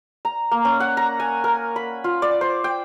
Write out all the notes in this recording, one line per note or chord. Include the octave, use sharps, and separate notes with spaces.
A#5
A#3
C#4
F#5
A#5
G#5
A#4
B5
F4
D5
C5
G5